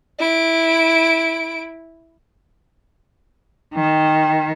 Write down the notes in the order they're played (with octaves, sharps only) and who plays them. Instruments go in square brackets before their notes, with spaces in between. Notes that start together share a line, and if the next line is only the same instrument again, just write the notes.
[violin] E4 D7
[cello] D#3 [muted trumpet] G5